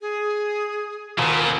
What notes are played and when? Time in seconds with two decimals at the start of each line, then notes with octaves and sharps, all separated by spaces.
0.01 G#4
1.18 D#1 A#2